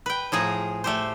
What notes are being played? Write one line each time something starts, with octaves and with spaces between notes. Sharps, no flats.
B4 G5
A2 F3 G#4 A#5
A3 G4 C5